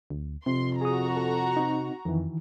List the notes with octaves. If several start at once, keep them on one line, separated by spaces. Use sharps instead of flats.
D2
F2 C3 C6
F#4 G#4 A#5 D#6
A4
C4 D#4
F2 D#3 E3